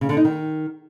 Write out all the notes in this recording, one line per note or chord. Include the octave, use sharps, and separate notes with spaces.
C#3
D3
D#4
D#3